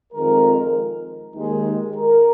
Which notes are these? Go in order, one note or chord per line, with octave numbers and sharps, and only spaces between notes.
F2 D#3 G#3 A#4
D#2 D#3 G#3
A#4